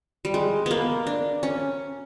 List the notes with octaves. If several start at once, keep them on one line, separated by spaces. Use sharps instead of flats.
G3
G#3
A#3 B3
D4
C#4